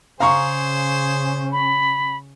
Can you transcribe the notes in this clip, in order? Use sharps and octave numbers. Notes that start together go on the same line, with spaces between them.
C#3 C#4 G#4 C5 F5 A#5 C#6
B5